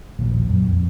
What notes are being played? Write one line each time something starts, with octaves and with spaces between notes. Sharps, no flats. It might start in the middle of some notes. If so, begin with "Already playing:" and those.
A#1 D#2 A#2
F#2
F2